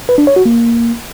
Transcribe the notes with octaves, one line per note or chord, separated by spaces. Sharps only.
B4
D4
C#5
F#4
A#3